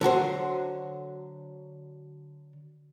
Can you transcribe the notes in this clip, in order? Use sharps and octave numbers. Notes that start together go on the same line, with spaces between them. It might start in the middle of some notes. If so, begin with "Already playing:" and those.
D3 F#3 F#4 C5